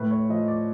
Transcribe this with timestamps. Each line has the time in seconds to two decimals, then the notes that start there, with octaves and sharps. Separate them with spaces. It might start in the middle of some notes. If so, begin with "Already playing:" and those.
Already playing: A2 B4
0.11 C#5
0.29 F3 D#5
0.48 D5